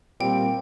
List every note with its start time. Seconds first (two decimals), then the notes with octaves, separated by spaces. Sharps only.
0.20 A#2 G3 C4 G4 G5